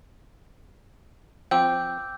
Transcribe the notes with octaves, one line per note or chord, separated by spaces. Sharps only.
F3 C4 G5 D6 E6 G6